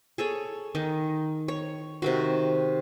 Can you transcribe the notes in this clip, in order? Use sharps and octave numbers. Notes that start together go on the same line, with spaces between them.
G#4 A4 C#5
D#3 D#4
C#5
C3 D#3 F#4